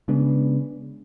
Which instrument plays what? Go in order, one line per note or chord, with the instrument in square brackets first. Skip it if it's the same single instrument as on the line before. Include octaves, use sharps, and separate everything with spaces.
[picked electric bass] C#3 G#3 B3 D4